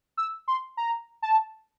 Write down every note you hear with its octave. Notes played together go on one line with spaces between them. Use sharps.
E6
C6
A#5
A5